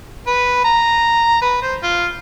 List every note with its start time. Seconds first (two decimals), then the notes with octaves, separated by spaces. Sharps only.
0.27 B4
0.64 A#5
1.42 B4
1.62 C5
1.83 F4